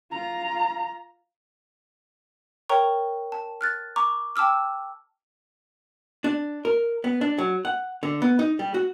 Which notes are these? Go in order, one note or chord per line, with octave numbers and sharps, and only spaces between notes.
F4 A#5
A#4 C#5 G5 A#5 C#6
A5
F6 F#6 A6
A#5 C#6 D6
G5 A5 D6 E6 F6
D4
A#4
B3
D4
F#3
F#5
D3
B3
D#4
G3
F#4